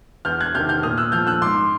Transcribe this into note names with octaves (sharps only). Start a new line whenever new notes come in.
E2 F6 G6
F#6 G#6
C3 D#3 F6 G6
F6 G6
A#2 D#6 F6
E6 F#6
F3 F6 G6
E6 F#6
G#2 C6 D6